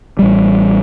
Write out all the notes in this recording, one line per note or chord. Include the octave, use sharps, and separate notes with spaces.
A1 G3